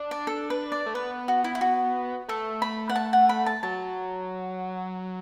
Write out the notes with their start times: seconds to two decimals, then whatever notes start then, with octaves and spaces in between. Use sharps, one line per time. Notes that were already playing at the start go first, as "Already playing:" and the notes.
Already playing: D4
0.11 D5
0.27 A4
0.50 B4
0.72 D5
0.86 A3
0.94 B3 B4
1.28 F#4
1.44 E4
1.55 E4
1.61 F#4
2.28 A3 A4
2.62 B5
2.89 F#5
2.96 A5
3.13 F#5
3.29 B5
3.46 A5
3.63 F#3 A5